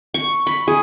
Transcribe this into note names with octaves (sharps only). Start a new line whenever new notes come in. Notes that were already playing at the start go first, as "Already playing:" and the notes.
C#6
B5
G#4